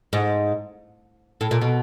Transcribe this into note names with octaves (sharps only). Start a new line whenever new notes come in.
G#2
A2
A#2
B2